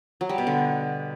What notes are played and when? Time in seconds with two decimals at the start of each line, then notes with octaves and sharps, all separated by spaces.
0.21 F#3
0.29 G3
0.38 B2
0.47 D3